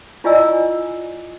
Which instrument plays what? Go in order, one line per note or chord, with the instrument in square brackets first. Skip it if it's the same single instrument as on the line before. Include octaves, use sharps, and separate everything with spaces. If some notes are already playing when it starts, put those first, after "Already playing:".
[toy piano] E4 F4 D5 D#5 G#5 E6